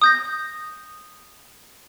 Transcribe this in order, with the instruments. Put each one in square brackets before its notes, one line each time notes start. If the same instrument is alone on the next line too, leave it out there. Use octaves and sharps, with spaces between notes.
[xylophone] D#6 G6 A#6